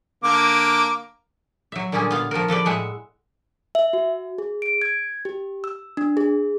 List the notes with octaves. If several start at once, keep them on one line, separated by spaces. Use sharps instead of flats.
D3 A#3 D6
F#3 E5
A#2 D3 G3 C#4 F4 G#4
B3 F4 F5
F3 F4 F#4 A#4
F3 A4 B4 D5
A2 G#3 E5 F#5
E5
F#4
G#4
D7
G#6
G4
E6
D4
G#4